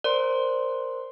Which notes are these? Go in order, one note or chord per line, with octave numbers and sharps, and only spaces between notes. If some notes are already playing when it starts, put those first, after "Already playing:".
A#4 C5 D5 C6